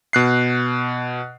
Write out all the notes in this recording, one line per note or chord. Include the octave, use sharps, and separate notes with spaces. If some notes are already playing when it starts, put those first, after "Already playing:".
B2 F#6 C7